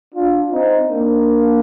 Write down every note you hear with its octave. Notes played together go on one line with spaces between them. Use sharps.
D4 F4
C4 D#4
A#3 D4